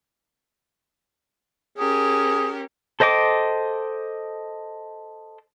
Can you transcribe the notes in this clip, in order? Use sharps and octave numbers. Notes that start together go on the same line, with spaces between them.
C#4 G4 G#4 A#4
A4 C5 D#5 G5 D6